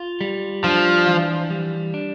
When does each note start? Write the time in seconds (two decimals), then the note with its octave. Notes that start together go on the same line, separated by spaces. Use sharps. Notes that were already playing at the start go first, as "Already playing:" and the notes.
Already playing: F4
0.21 G3
0.64 F3 D4
1.06 E3
1.50 G3
1.94 D4